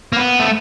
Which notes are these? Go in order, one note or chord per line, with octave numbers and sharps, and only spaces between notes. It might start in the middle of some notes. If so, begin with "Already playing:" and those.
A#3
B3
A3